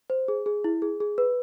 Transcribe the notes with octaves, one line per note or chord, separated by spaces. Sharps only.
C5
G#4
G#4
E4
G#4
G#4
B4